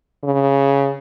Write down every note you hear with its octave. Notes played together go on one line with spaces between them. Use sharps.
C#3